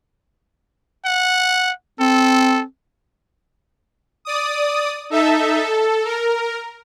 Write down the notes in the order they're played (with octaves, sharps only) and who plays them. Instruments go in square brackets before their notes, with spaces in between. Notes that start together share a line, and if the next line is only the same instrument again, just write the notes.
[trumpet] F#5
[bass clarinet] C4 [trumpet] A4
[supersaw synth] D5 D#6
D#4 A4 E5
A4
A#4